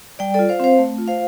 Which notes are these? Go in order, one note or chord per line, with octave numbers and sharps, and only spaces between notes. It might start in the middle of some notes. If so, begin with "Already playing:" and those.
G3 D5 G5
F4 A4 D5
C5 F5
C4 C5 F5
A3
F4
C5 F5